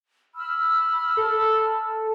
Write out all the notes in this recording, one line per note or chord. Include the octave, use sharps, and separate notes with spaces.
B5 E6 F6
A4